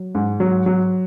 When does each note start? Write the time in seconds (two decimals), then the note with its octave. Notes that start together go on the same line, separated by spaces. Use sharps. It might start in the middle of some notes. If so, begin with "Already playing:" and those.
Already playing: F#3
0.15 G#2
0.40 F#3
0.66 F#3